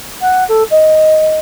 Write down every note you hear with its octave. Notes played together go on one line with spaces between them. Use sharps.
F#5
A4
D#5